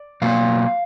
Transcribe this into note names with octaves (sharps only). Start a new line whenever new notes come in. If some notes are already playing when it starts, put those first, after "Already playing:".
Already playing: D5
B2 F#3 A#3 F5